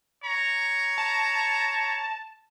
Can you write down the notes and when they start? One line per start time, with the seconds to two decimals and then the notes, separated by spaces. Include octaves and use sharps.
0.24 C#5 A#5
0.98 A5